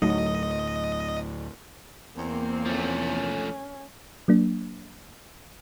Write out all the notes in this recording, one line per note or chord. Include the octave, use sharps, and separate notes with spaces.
D2 A2 F#3 A3 D#4 D#5
E2 A#3 C4
F3 A3 C#4
F#3 A#3 D4